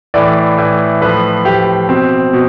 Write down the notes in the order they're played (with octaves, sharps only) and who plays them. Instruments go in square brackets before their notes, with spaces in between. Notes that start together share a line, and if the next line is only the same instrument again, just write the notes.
[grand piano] A2 E3 D5
A2 E3
A2 F3 B4
A2 F3 G4
B2 C4
B2